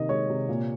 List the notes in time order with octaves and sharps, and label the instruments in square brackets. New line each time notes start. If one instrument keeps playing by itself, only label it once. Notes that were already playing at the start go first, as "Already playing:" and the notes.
Already playing: [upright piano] C3 D#3 A#3 D#5
G#3 C#5
C3
A#2